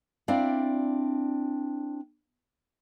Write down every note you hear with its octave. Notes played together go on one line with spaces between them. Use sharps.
C4 D4 E4 D5 F5